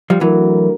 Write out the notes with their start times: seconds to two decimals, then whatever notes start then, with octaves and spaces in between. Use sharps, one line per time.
0.10 F3 G3
0.21 E3 F#3 A3 D4 F#4 A#4